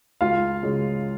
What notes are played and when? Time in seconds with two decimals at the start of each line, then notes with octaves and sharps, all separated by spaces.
0.21 C#2 F4 F5
0.63 C#3 G#3 C#4